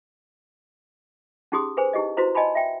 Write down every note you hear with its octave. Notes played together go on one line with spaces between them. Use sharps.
C#4 D#4 G4 G#4 C6 D#6
G#4 B4 C5 G#5
D#4 E4 G4 G#4 D#5
E4 F#4 B4 C5 A#5
D5 D#5 G#5 A5 B5 C6
E5 G5